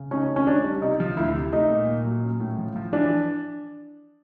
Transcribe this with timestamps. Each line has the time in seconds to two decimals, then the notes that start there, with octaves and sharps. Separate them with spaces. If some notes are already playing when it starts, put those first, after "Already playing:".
Already playing: C#3
0.11 C#4 D#4
0.29 D#3
0.36 C#4
0.47 D4 D#4
0.64 G3
0.82 C3 D#4
1.00 F3
1.17 D2 E4
1.35 C3
1.52 A3 D#4
1.70 A#2
1.87 A#2
2.05 F#3
2.23 C#4
2.40 A2
2.58 F3
2.76 F3
2.93 E3 D4